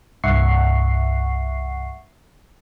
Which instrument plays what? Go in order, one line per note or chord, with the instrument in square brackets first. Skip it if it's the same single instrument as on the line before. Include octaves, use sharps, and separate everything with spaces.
[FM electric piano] C2 G2 E5 F#5 C#6 C7